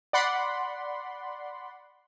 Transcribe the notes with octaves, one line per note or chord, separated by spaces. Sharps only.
D5 F#5 B5 C6